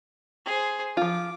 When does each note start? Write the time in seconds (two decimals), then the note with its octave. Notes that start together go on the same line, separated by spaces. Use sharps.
0.45 G#4 C5
0.97 F3 F4 D6